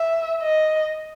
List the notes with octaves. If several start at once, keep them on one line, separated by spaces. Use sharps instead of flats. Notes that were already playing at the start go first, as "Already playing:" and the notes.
Already playing: E5
D#5